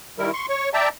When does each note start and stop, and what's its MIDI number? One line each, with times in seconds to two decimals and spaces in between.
0.18 0.31 51
0.18 0.31 55
0.18 0.31 64
0.18 0.31 70
0.33 0.46 84
0.33 0.46 85
0.49 0.69 73
0.49 0.69 85
0.73 0.89 74
0.73 0.89 76
0.73 0.89 79
0.73 0.89 81
0.73 0.89 82